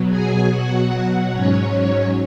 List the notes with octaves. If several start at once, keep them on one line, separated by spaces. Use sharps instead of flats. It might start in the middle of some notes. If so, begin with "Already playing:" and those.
Already playing: B2 F#3
G#4 G#5
B2 F#3 F#4 F#5
G#2 F#3 C#4 C#5